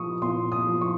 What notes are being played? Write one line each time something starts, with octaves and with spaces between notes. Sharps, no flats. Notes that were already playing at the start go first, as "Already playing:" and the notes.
Already playing: A#2 F3 C#6 D#6
A#2 C6
D#6
F3
C#6